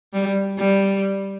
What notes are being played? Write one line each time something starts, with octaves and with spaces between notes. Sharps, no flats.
G3
G3